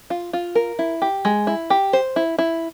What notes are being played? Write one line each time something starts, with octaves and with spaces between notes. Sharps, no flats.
F4
F4
A#4
E4
G4
G#3
E4
G4
C5
E4
E4